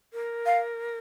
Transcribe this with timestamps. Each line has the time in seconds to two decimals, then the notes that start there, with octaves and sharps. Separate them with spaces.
0.13 A#4
0.46 F5